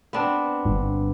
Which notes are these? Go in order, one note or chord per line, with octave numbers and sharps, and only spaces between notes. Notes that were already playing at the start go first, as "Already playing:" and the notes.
B3 C4 D4
G1 G2